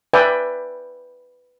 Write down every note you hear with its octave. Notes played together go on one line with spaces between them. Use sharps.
B4 D5 E5 G5 G#5